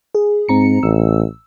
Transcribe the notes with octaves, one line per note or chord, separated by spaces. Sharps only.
G#4
G#2 C4 A#5 C#7
A1 E6